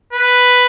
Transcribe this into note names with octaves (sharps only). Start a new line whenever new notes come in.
B4